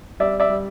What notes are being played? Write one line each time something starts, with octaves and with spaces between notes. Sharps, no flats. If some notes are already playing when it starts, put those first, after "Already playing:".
G3 D5 E5
D5 E5
G3